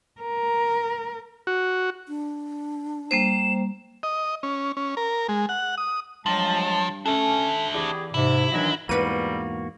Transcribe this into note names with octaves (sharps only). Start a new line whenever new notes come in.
A#4
F#4
D4
G3 A#3 C5 E7
D#5
C#4
C#4
A#4
G#3
F#5
D#6
G2 F3 F#3 G#3 A5
C#4 D4 A4 E5
E3 G4 G#4 D5
G#2 C3 E4
D#3 E3 F#3 D4 D#4 F#4
E2 G#2 G3 A#3 F#4 B4 D#7